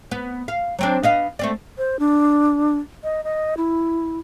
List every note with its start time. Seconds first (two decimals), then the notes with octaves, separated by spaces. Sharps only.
0.11 B3
0.48 F5
0.79 F#3 C4 D4
1.03 B3 D#5 F5
1.39 A3 C4 D5
1.78 C5
1.99 D4
3.04 D#5
3.24 D#5
3.57 E4